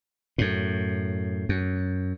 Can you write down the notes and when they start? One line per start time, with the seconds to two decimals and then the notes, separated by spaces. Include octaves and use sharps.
0.38 F#2 A2
1.49 F#2